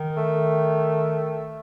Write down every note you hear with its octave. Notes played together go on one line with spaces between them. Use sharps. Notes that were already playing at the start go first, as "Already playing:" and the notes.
Already playing: D#3
A3